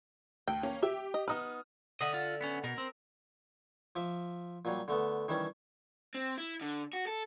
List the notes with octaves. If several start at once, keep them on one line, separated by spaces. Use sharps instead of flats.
D2 G5
A#3 C#4
G4 E5
D#5
B3 D#4 B4 D#6 F6
D3 D#5 E5 F#5
F4
B3 C#4
B2 A#4
C4
F3 E5 D6
A#2 F#3 G3
D3 A3 B3
D#3 E3 G3 C#4
C4
E4
D3
F#4
A4